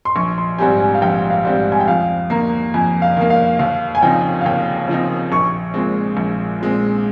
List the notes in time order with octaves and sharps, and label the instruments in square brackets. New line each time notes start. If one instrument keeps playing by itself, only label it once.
[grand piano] C6
[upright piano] A#1 [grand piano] C#6
[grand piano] C6
[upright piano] G#2 G3 C4 G4 [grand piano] G#5
[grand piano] G#5
F5
[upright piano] A#1 [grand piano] G5
[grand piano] F5
[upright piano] G#2 G3 C4 G4
[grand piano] G#5
G5
[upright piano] F2 [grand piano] F5
[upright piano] D#3 A#3 [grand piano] A#5
[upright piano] F2 [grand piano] G#5
[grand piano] F5
[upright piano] D#3 A#3
[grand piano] F5
[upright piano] D#2 [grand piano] F5
[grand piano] G#5
[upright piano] C#3 F3 C4 D#4 [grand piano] G5
[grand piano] F5
[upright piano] D#2 [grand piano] G5
[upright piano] C#3 F3 C4 D#4
[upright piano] A#1 [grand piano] C#6
[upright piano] A#2 G#3 C4
A#1
A#2 G#3 C4